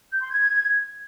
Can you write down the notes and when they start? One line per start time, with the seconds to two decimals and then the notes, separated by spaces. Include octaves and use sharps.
0.12 G6
0.21 C6
0.30 G#6